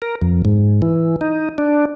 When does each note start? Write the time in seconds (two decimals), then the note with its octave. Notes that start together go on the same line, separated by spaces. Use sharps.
0.02 A#4
0.22 F2
0.45 G#2
0.82 E3
1.21 D#4
1.58 D4